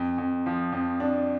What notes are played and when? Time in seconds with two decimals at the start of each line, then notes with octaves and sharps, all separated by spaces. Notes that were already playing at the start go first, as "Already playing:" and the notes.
Already playing: F2
0.18 F2
0.46 F3
0.72 F2
1.00 D4